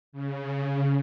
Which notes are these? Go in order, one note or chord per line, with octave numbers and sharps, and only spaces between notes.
C#3